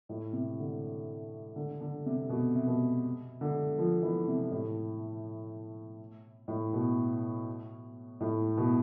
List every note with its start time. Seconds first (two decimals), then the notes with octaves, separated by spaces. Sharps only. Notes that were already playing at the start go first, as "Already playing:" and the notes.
0.09 A2
0.33 C3
0.58 D3
1.56 D3
1.81 D3
2.06 C3
2.30 B2
2.55 C3
2.67 B2
3.41 D3
3.78 F3
4.03 E3
4.28 C3
4.51 A2
6.48 A2
6.73 B2
8.20 A2
8.57 B2